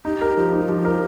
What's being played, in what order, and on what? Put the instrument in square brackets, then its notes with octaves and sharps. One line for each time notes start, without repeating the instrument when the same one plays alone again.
[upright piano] D#4 [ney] G4
[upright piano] A#4
[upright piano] F3 [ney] G4
[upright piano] D#4
[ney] F4
[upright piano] F3 [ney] G4
[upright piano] A#4